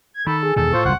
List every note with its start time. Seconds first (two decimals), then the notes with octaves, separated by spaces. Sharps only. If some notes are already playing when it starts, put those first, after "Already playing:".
0.14 G#6
0.27 D#3 A4 B5
0.43 G#4
0.56 E2 B2 D#3 A4
0.73 A2 F4 C5 C#6
0.85 F#1 C2 G3 F#5